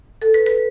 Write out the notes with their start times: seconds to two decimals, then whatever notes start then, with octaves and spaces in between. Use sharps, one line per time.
0.22 A4
0.34 B4
0.46 B4